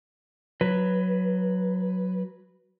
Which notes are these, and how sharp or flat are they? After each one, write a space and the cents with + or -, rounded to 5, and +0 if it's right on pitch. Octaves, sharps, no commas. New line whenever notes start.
F#3 +0 B4 +0